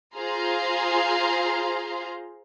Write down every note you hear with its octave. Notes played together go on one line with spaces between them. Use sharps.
F4 G#4 C5 F5 A#5 C6